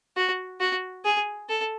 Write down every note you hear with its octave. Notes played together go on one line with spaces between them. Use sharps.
F#4
F#4
G#4
A4